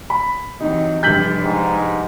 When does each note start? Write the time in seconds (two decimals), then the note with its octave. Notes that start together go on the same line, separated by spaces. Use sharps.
0.10 B5
0.60 C3 E3 F#3 D#4
1.03 F1 G2 G3 G#3 G6 A6 B6 F#7
1.43 G#2